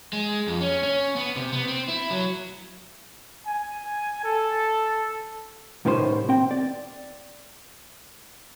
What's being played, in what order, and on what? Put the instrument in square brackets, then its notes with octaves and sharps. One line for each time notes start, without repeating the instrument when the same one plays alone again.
[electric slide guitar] G#3
F2
C#4
C#4
B3
C3
B3
C4
E4
F#3
[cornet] G#5
A4
[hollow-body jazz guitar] C2 A2 D#3 C#4 A4 C5
C4 G5
D5